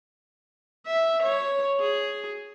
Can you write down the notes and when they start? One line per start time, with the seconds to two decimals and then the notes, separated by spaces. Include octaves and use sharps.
0.87 E5
1.23 C#5
1.80 G#4